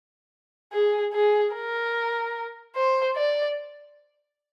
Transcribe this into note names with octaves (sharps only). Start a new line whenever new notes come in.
G#4
G#4
A#4
C5
D5